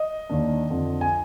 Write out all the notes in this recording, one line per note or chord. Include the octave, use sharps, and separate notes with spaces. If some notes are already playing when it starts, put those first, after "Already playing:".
Already playing: D#5
D#2 D#3 A#3 D4
F2 D3 F3
G#5